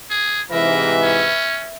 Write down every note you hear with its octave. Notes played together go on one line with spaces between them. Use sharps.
G#4
G#2 C3 E3 A#4 B4 E5
C#4